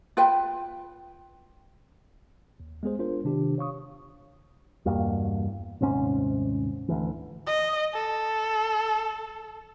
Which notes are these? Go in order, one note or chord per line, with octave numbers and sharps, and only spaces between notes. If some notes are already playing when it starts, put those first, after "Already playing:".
F4 B4 G5
D#2
G#3 B3 G#4 C5
D4 F4 A#4 C5
C3 D#3 D4 G4
C#5 F5 C#6 D#6
E2 G2 B2 A#3
D#1 G#2 C3 C#4
D2 E3
D#5
A4